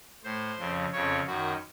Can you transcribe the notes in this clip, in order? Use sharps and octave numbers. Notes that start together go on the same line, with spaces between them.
A2 C5
F2 C#3
F2 C#3 C#5
F#2 D#3 F#4